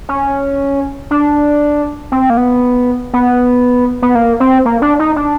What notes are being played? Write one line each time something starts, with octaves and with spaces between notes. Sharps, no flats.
C#4
D4
C4
A#3
B3
B3
B3
A#3
C4
A#3
D4
D#4
D4